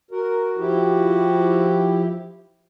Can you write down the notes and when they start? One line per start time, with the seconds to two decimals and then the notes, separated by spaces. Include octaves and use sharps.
0.11 F#4 A#4
0.58 F3 E4 G4